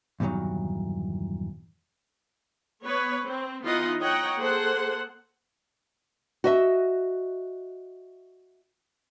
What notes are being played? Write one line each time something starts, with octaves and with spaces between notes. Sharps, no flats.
E2 G2 A#2 D#3 F#3
B3 B4 C#5
C4
E3 B3 D#4 F4 D#5 F#5
C#5 D#5 F#5 G5 A#5
A#3 G#4 A4 C5 F#5
F#4 D#5 E5